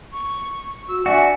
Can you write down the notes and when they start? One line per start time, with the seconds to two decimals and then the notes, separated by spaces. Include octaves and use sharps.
0.12 C#6
0.88 F#4 E6
1.06 D4 F#4 E5 G#5